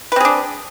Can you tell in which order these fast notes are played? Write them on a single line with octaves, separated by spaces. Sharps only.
B4 C4 G#4 D4